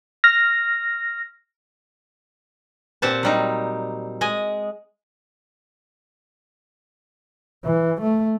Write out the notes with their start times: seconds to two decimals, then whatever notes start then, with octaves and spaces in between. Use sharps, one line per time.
0.24 F6 A#6
3.02 A#2 C4 G4 C5 F#5 A5
3.23 F#3 G3 D#4
4.21 G#3 D#5 G#5
7.64 E3
8.02 A3